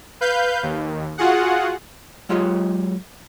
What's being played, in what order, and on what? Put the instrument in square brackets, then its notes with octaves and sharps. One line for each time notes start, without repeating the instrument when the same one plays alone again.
[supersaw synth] B4 F5 G6
D#2
F4 F#4 G#4 F#5
[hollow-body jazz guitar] F#3 G#3 F4 G4 C#5 D#5